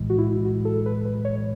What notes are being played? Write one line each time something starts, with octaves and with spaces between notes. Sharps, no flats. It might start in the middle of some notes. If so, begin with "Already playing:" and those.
Already playing: B1 A2 E3 G#3
F#4
E4
F#4
A4
B4
B4
C#5